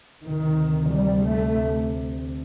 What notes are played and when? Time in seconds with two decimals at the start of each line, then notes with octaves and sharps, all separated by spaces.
0.22 D2 C3 D#3
0.90 G3
1.24 A3